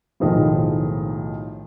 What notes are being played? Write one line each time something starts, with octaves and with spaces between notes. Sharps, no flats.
B1 A2 D#3 F3 G#3